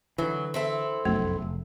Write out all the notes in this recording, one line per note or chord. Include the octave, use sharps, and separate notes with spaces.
D3 E3 F#3
C4 E4 A4
F1 B1 F#2 A3
F1